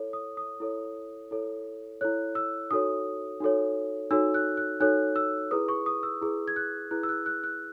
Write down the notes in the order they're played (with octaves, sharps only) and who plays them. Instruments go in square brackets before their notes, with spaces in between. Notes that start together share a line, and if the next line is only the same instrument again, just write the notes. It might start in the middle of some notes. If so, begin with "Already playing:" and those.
Already playing: [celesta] E4 A4 C#5
D#6
D#6
E4 A4 C#5
E4 A4 C#5
E4 A4 C#5 F#6
E6
D#4 F#4 A4 C#5 D#6
D#4 F#4 A4 C#5
D#4 F#4 A4 C#5 E6
F#6
F#6
D#4 F#4 A4 C#5 F#6
E6
E4 G#4 B4 D#6
C#6
D#6
E6
E4 G#4 B4
G#6
F#6
E4 G#4 B4 F#6
E6
F#6
F#6
F#6